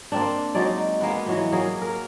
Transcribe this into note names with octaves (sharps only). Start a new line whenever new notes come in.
A#3 C4 D4
F#3 G#3 D#4 D5
G#3 A#3 B3 B4
E3 F#3 B3
F#3 A#3 G#4
A#4